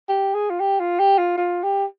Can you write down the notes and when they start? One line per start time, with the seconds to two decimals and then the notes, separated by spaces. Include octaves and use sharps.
0.09 G4
0.34 G#4
0.50 F4
0.60 G4
0.80 F4
0.99 G4
1.18 F4
1.37 F4
1.63 G4